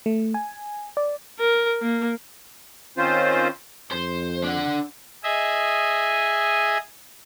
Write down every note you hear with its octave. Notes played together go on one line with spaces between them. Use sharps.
A3
G#5
D5
A#4
A#3
D#3 C4 C#4 F4 C5
F2 C5
D4 F#5
G#4 D#5 E5 G#5